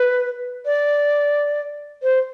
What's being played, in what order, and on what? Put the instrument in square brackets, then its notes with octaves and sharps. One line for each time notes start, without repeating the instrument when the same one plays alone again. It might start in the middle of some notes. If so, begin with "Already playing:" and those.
Already playing: [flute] B4
D5
C5